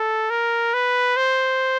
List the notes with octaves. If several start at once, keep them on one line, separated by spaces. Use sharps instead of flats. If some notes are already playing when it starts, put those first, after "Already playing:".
Already playing: A4
A#4
B4
C5